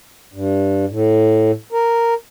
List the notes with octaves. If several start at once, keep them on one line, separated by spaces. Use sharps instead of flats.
G2
A2
A#4